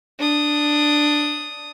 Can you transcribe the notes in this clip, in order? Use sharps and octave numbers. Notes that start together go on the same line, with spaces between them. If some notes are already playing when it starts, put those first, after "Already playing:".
D4 D#6